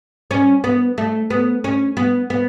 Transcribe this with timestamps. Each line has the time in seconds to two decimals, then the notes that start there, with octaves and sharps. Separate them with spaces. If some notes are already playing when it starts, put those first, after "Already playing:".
0.31 C#4
0.64 B3
0.98 A3
1.30 B3
1.64 C#4
1.97 B3
2.30 B3